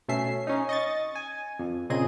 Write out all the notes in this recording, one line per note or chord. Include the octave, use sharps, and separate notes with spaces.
B2 A3 C#4 E5 C7
C#4 D#4
D#5 C#6 A6
G#5
F2
A#2 C#3 C4 G#4 D#5 D#7